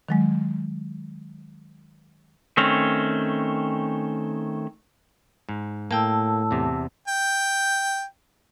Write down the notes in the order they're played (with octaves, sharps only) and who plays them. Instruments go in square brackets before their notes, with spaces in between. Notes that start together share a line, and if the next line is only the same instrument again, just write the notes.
[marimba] D#3 F#3 G#3
[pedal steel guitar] D#3 A3 C4 C#4
[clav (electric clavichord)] G#2
[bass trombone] A2 [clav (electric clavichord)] A#3 G5 [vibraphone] A5 E6
[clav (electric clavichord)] E2 C3
[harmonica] G5